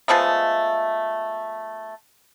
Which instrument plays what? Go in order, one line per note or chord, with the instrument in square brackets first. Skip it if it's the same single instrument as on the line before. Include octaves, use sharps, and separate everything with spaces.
[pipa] F3 G#3 A3 B3